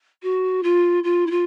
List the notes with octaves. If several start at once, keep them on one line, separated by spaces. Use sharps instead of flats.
F#4
F4
F4
E4
F4